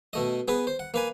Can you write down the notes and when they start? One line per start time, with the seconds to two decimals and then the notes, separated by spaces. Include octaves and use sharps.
0.13 B2 A3 D#5
0.48 B3 G#4 B4
0.67 C5
0.79 F#5
0.94 A#3 B4 G#5